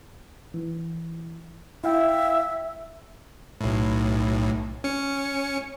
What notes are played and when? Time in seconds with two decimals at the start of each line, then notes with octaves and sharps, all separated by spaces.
0.54 E3
1.84 E4 E5 F5 G5
3.61 B1 A2
4.84 C#4 C#7